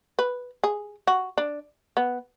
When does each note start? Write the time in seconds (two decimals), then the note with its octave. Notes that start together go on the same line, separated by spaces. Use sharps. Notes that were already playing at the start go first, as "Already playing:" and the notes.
0.19 B4
0.64 G#4
1.07 F#4
1.38 D4
1.97 B3